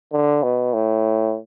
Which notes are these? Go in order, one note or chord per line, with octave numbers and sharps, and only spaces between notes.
D3
B2
A2